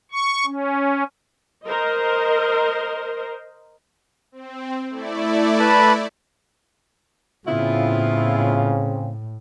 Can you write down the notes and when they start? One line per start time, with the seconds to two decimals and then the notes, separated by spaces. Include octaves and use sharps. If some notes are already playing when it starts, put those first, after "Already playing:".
0.12 C#6
0.46 C#4
1.65 A#4 C5 D#5
4.32 C4
4.90 A3 E4 D5
5.59 B4 A5 B5
7.47 A2 C#3 B3 C4 E4 F4